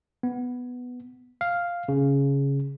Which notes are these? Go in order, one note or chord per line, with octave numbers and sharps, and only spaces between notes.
B3
F5
C#3